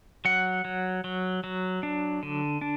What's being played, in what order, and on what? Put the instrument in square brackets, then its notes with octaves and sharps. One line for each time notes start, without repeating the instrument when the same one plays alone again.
[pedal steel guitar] F#3 F#5
F#3
F#3
F#3
D4
D3
D4